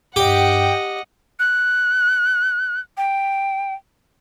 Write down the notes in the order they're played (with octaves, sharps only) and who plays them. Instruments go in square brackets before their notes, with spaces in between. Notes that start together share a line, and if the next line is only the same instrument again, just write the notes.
[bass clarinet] G2 [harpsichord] G4 [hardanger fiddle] D#5 F#5 [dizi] G5
[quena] F#6
G5